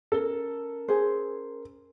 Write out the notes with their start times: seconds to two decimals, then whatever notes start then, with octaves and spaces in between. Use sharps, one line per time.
0.12 C#4 A4 A#4
0.88 G#4 C5